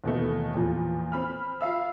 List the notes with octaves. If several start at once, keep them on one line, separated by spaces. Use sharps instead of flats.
D#2 B2 E3 A3
E2 A#2 E3 F3
C4 B5 F6
F4 E5 F5 E6